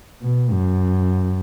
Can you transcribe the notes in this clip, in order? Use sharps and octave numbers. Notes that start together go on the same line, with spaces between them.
B2
F#2